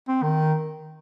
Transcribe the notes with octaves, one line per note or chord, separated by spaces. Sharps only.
C4
D#3